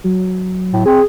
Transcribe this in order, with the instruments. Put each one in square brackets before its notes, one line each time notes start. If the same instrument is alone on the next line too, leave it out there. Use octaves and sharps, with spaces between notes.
[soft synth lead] F#3
[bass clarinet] A2
[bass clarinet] C4 [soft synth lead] G#4